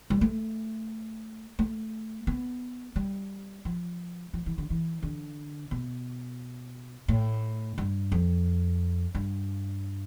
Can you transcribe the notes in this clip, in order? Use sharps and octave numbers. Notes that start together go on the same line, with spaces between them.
G3
A3
A3
B3
G3
F3
F3
E3
D3
E3
D3
B2
A2
G2
F2
G2